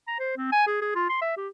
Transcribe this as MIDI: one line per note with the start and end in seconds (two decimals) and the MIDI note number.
0.08 0.18 82
0.20 0.32 72
0.37 0.48 60
0.52 0.65 80
0.67 0.80 68
0.82 0.93 68
0.95 1.09 65
1.10 1.21 84
1.22 1.34 76
1.37 1.48 67